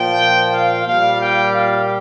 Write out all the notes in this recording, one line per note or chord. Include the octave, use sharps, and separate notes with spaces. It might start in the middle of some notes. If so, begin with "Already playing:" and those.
Already playing: A#2 F3 G5
F5
A#2 G3 F5
G5
F5